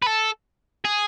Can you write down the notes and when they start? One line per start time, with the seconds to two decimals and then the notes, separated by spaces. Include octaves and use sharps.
0.02 B4
0.07 A4
0.85 G#4